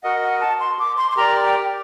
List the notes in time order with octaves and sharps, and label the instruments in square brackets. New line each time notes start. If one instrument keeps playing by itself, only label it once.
[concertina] F#4 A#4 D#5 [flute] F#5
[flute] F#5
A5
C6
D6
C6
C6
[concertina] G4 A#4 D5 [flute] A#5
[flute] G5